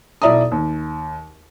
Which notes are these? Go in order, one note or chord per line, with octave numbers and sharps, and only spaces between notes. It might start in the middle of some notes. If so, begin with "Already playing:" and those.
B1 E4 D5 E5 A#5 D#6
D#2